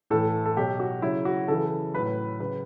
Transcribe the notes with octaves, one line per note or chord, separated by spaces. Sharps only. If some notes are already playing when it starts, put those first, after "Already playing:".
A2 E3 A4
A4
B2 F#3 G4
F#4
C#3 F#3 E4
F#4
C#3 E3 A4
A2 F#3 B4
C#3 F#3 B4